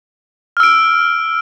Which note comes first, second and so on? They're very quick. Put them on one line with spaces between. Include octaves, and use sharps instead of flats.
F6 E6 D7